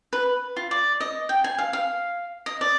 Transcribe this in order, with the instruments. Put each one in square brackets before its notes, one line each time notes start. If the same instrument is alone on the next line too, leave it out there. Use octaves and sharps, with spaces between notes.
[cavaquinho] B4
F4
D5
D#5
G5
G#5
F5
F5
D#5
D5